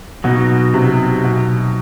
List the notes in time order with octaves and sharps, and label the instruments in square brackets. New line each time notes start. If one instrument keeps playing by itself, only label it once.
[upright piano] B2 [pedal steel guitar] F#3 B3 D#4
[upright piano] C3
B2